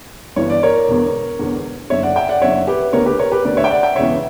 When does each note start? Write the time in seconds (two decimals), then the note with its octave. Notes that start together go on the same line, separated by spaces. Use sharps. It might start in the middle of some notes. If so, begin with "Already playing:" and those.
0.36 G1 G2 E3 C#5
0.50 D5
0.63 A#4 C#5
0.88 E1 E2 D3
1.39 E1 E2 D3
1.90 F#1 F#2 D3 C#5 E5
2.03 D5 F#5
2.16 E5 G5
2.29 D5 F#5
2.42 F#1 F#2 D3 C#5 E5
2.67 G4 B4
2.93 D2 A#4 C#5
2.98 D3
3.06 G4 B4
3.19 A#4 C#5
3.32 G4 B4
3.45 D2 D3 B4 D5
3.57 C#5 E5
3.64 G5
3.70 D5 F#5
3.83 E5 G5
3.96 E1 E2 C#3 E3 C#5 E5